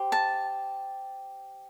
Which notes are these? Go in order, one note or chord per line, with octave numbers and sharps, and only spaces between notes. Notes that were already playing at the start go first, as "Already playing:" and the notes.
Already playing: G4 C5
A5